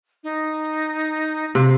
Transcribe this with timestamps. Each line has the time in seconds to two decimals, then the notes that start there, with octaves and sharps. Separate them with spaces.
0.24 D#4
1.55 C3 F5